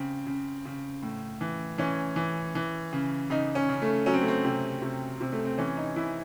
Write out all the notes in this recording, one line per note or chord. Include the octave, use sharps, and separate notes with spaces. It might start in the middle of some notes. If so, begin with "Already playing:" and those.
Already playing: C#3 C4
C#3
C#3
A2
E3
E3 C#4
E3
E3
C#3
C#3 D#4
C#4
C#3
A3
F#3 C#4
C4
A3
C4
C3
C3
C3
A3
C4
E3 C#4
D#4
E3 E4